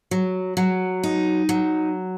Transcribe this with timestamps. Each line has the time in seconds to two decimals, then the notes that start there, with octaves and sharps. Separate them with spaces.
0.11 F#3
0.57 F#3
1.04 D#4
1.49 F#3